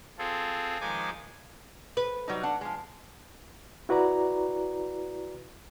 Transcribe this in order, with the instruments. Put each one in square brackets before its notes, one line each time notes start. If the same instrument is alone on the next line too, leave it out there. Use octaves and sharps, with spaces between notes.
[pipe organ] C4 F4 G#4 A4
D#3 F3 G#3 G#5 D6
[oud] B4
[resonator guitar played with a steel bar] F#3 G3 D#4
D4 F#5
F3 G#3
[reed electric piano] E4 F#4 B4 D5 A#5